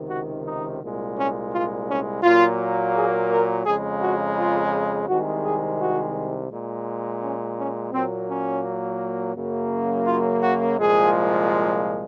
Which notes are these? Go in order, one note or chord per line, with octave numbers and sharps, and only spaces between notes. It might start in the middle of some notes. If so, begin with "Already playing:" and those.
Already playing: C#2 C3 D#3
F#4
D#4
C2 A#2 G#3
C#4
F4
C#4
A#2 F#3 A#3 F4
G#4
A#4
F2 C#3 G#3 G#4
F#4
F4
C2 C3 D#3 G#3 F#4
G#4
F#4
A#2 G#3
C#4
C#4
A#2 F#3 A#3 C4
C#4
F#2 C#3 F#3 A#3
F4
F#4
C2 A#2 F3 G#3 G#4